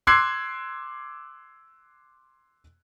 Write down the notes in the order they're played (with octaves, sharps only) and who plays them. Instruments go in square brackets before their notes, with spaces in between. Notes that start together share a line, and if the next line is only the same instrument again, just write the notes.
[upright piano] C6 D6 E6 F#6 G#6 C7